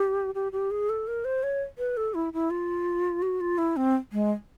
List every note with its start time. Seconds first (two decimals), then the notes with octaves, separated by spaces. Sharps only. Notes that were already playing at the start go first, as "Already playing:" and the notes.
Already playing: G4
0.35 G4
0.52 G4
0.71 G#4
0.89 A4
1.07 A#4
1.25 C5
1.43 C#5
1.78 B4
1.97 A4
2.14 E4
2.33 E4
2.50 F4
3.22 F#4
3.41 F4
3.58 E4
3.77 C4
4.13 G#3